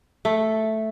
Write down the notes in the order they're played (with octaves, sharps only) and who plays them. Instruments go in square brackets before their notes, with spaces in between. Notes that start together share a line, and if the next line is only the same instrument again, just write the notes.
[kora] A3 A4